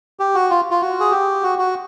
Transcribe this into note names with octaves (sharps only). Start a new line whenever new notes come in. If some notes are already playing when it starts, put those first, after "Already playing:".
G4
F#4
F4
F4
F#4
G#4
G4
F#4
F#4